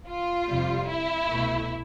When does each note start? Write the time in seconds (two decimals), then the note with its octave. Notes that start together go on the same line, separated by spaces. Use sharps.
0.08 F4
0.48 F2 C3 G3
0.88 E4
1.29 C2 B2 A3